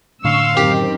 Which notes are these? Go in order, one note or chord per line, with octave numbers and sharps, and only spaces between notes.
A2 D3 D4 F5 C6 C#6 E6
F#2 D#3 C4 G4